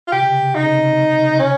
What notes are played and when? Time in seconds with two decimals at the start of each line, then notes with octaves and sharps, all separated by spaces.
0.08 F4
0.12 C3 G4
0.22 C#3
0.32 C3
0.43 C#3
0.52 C3 D#4
0.63 C#3
0.72 C3
0.83 C#3
0.93 C3
1.03 C#3
1.13 C3
1.23 C#3
1.33 C3
1.39 C#4